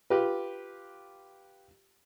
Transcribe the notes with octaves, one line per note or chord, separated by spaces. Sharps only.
F4 G4 B4